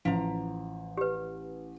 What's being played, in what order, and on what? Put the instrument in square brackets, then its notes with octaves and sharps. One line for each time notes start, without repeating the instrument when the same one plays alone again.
[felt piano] A1 [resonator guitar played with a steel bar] F3 A#5
[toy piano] G4 B4